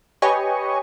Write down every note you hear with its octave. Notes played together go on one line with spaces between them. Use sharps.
G4 B4 C#5 D#5 G#5 C#6